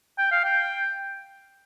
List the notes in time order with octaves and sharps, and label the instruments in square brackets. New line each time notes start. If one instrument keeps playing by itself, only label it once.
[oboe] G5
F5
G5